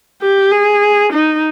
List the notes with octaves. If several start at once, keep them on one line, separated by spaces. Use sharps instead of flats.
G4
G#4
D#4